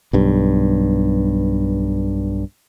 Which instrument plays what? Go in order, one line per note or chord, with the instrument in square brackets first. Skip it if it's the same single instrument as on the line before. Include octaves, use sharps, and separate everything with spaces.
[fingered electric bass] B1 G2